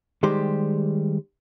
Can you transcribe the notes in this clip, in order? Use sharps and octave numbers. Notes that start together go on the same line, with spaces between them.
D#3 G3 G#3 G4 C5